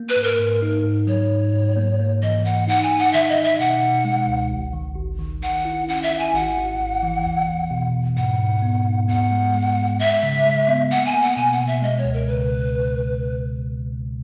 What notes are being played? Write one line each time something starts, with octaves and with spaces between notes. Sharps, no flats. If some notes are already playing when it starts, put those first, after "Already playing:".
Already playing: A#3
B4
G#2
A#4
G#2
D#4
G#2
F#3 C#5
G#2
G#2
A#3
A#3
E3 D#5
A#3 F#5
D#4 F#5
G#5
D#4
F#5
D#3 E5
D#5
D#4
E5
B2 F#5
B2
G#3
C#2
G#1
D#3
G#1
D#3
D#3 F#5
E4
C#4 F#5
E5
E4
G#5
G#1 F#5
G#1
G#1
E3
E2
E2
B2
E2
G#2 F#5
G#2
B3
G#2
B3 F#5
G#3
G#3
G#3
G#3 E5
C#3
G#3
B3
A#3 F#5
G#5
A#3
F#5
B2 G#5
F#5
B2
E5
G#3 D#5
C#5
C#2
A#4
C#3 B4